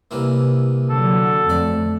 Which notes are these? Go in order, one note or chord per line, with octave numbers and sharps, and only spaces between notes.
C2 E3 A#3
D3 F#3 A4
F2 A3 D5